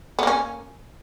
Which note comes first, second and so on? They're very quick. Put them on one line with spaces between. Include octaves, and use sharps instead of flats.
B3 A#3 C#4